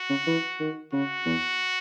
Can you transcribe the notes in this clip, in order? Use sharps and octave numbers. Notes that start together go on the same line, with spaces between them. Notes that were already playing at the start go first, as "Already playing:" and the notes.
Already playing: F#4
C#3
E3
D#3
C#3 F#4
E2